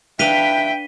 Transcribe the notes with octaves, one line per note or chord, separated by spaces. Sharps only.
D4 B4 E5 F5 G5 B6 D#7 G7